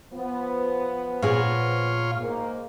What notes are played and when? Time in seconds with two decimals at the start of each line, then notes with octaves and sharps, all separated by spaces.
0.14 F3 B3
1.22 A#2 F4 G#4 C#5 F5
2.20 G#2 A#3